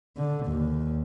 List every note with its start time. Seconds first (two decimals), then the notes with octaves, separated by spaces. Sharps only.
0.17 D3
0.46 D#2